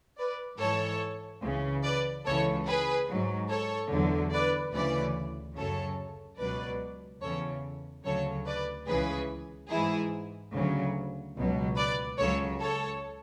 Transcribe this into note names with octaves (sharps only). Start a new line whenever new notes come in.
B4 D5
G#2 E3 A4 C#5
C#2 C#3 E3
B4 D5
C#2 C#3 E3 A4 C#5
G#4 B4
G#2 F#3
A4 C#5
E2 D3 F#3
B4 D5
D2 C#3 E3 B4 D5
F#2 C#3 F#3 A4 C#5
C#2 B2 F#3 B4 D5
E2 C#3 E3 A4 C#5
D2 C#3 F#3 A4 C#5
B4 D5
C#2 C#3 E3 G#4 B4
G#2 E3 E4 G#4
D2 C#3 F#3
C#2 B2 F#3
B4 D5
C#2 C#3 F#3 A4 C#5
A4 C#5